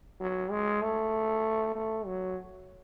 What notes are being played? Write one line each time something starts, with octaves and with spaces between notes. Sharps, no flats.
F#3
G#3
A3
A3
F#3